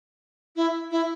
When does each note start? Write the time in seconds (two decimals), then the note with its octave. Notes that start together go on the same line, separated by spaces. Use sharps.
0.56 E4
0.91 E4